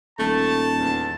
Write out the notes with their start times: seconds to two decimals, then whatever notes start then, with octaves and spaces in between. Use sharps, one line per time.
0.19 D#1 A3 A5
0.79 E2